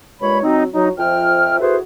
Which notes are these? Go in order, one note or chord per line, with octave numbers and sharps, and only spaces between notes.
G2 A#2 G#3 C#5 B5
F#3 C4 D#4
F#3 D#4
F2 F3 E5 G5 F6
E4 F#4 G#4 A4 B4 C5